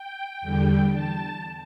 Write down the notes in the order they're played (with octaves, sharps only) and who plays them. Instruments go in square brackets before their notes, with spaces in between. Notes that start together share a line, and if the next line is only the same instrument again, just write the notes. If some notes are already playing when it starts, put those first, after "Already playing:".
Already playing: [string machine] G5
E2 D3 G3
A5